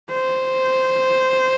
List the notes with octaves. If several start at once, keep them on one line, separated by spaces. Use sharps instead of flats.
C5